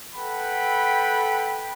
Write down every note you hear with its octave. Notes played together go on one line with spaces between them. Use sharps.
A4 B4 F#5 G5 B5